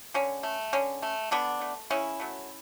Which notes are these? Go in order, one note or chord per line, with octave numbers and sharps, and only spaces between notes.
D3 C#4
A3
D3 C#4
A3
D3 B3 D4
A3
C#3 C#4 E4
F#3 A3